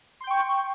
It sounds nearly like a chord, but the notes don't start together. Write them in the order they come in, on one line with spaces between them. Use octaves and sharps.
C6 G6 G5 C#6